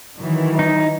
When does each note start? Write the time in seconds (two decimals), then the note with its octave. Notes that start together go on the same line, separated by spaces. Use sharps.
0.17 D#3 E3 F#3
0.59 D#4